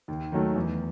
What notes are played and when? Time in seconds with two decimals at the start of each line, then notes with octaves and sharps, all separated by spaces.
0.08 D#2
0.32 D#3 F#3 A3
0.56 E2